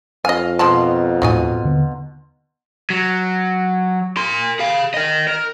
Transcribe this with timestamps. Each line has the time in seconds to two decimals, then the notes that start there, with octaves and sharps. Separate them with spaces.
0.25 F2 D#5 F5 G#5
0.59 B2 F3 G#3 A5 A#5 C6
1.22 D#2 A2 F#3 D#4 G#5
1.63 D#2 D3 B3
2.90 F#3
4.17 A#4 C6
4.59 G#4 F5
4.94 A#4 D#5
5.28 A#4